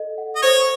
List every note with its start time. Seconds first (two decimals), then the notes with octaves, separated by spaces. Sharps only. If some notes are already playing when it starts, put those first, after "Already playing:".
Already playing: A4 D#5
0.18 F#5
0.36 D#5
0.43 C5 C#5